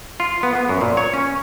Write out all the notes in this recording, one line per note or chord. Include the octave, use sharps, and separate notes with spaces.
F4
B3
B3
F#2
A#2
C#5
C#4